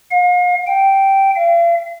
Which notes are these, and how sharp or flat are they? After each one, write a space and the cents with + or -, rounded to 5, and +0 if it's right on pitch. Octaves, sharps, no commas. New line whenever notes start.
F5 +40
G5 -10
F5 -40